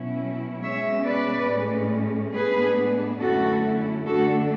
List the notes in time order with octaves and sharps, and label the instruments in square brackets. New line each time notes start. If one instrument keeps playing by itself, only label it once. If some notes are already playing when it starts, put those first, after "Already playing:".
Already playing: [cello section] B2 F#3 C#4 E4
B2 G#3 C#4 C#5 E5
B4 D5
A2 G#3 C#4
A2 G#3 B3 D4 G#4 B4
F#2 D3 A3 C#4 E4 F#4 A4
F#2 D3 A3 D4 F#4 A4